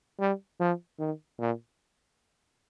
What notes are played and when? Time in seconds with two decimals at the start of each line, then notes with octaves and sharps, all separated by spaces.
0.20 G3
0.60 F3
0.99 D#3
1.39 A#2